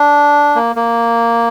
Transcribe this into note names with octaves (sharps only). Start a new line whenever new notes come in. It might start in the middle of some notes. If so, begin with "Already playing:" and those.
Already playing: D4
A#3
A#3